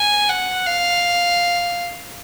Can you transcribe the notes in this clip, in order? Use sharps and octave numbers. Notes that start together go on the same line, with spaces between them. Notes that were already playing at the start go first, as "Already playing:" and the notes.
Already playing: G#5
F#5
F5